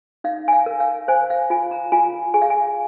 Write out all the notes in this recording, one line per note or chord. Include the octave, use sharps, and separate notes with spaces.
D#4 F5
G#5
F5
A#4
F5
C5 G#5
F5
F4 G#5
A#5
F4 G#5
G#4 G#5
F5
G#5